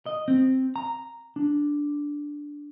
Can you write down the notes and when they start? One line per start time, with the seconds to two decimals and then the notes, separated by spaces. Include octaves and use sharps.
0.06 D#5
0.28 C4
0.76 A#5
1.36 D4